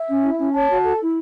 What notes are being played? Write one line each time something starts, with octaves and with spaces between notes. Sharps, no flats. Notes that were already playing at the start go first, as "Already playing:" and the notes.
Already playing: E5
C#4
E4
C#4
C#5 A5
F#4
A4
E4